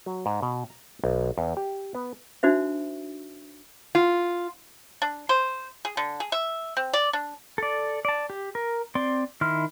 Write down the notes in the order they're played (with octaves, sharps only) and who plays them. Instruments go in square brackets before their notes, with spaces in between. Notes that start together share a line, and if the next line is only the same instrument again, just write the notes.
[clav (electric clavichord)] F#3
G#2
B2
A#5
B1
E2
G4
B3
[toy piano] D4 D#4 F#4 C5 E5
[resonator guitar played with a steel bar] F4
[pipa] D4
C5
G#4
D3
G#4
E5
C4
D5
D4
[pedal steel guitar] A4 D5
D5 A5
G4
A#4
C4 D5 G5 C6
D#3 E4 C6 F6